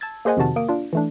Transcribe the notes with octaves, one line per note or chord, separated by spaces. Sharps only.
A5 E6 G#6 A6
A#3 G#4 C5 D#5 F#5 G#5
F2 C3 D#3 F#4 A5
A#3 D#6 D7
D4 F4
E3 A3 D4